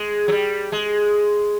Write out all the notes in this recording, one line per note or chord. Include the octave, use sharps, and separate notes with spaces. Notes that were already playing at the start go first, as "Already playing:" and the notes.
Already playing: G#3
F#3
G3
G#3